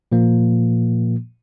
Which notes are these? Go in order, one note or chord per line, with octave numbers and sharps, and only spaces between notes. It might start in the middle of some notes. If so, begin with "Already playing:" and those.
A#2 F3 A#3